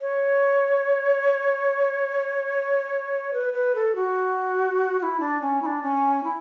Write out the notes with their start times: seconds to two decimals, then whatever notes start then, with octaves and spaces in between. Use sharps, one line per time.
0.01 C#5
3.33 B4
3.53 B4
3.75 A4
3.95 F#4
4.99 F#4
5.03 E4
5.20 D4
5.41 C#4
5.62 E4
5.66 D4
5.83 C#4
6.24 E4